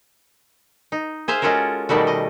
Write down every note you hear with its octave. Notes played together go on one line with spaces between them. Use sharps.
D#4
G#4 C5 E5 F5
G#3 C#4 F4 F#4 A4 A#4
B2 D#3 G3 A3 F#4
D#5